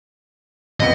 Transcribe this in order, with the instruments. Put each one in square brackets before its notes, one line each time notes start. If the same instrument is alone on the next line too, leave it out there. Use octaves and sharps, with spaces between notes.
[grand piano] F2 B3 C#7 [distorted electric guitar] D#5